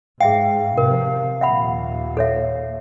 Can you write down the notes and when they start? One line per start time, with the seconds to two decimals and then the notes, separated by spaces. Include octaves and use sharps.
0.21 G#2 G#4 E5 F5 G5
0.78 C3 F3 A#4
1.41 D#2 A#2 E5 F#5 B5
2.17 A4 C#5 E5